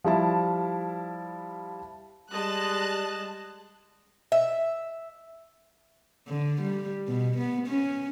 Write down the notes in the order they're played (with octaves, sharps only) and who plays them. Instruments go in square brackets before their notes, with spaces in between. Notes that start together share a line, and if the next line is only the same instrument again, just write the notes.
[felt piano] F3 G3 E4 A5
[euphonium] G3 [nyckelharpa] G#3 D#5 [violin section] A5 F#6
[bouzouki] E5
[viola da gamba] D3
G3
B2
B3
C#4